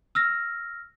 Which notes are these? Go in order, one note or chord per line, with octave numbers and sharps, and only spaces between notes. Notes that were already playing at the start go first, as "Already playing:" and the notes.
E6 F6 A#6